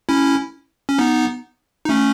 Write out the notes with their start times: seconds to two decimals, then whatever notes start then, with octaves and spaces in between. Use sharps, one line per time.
0.09 C#4 E4
0.89 C#4
0.99 B3 D#4
1.85 D#4
1.89 A3 C#4